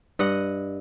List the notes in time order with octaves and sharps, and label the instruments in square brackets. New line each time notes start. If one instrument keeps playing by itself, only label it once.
[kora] G2 D#5 F#5